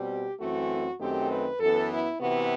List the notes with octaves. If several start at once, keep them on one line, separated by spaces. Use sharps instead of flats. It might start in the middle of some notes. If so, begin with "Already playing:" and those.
Already playing: B2 G3 C4 G4
F#2 E3 A3 C4 F#4
F#2 D#3 A3 C4 G4
B4
F#2 E3 B3 A4
E4
C3 E3 B3 F#4